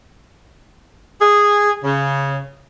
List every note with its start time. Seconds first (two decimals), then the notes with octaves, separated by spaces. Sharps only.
1.22 G#4
1.84 C#3